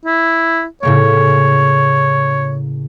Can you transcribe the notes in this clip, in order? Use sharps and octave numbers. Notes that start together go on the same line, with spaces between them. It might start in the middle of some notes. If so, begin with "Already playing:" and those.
E4
A2 C#3 A#3 C#5